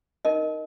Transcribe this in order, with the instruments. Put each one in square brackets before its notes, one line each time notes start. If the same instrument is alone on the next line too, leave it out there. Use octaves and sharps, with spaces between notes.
[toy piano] D#4 A#4 D#5